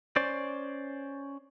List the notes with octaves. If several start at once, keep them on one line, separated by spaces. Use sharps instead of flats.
C#4 C5 D5